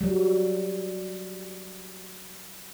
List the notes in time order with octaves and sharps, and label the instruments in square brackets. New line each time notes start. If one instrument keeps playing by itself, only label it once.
[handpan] F#3 G3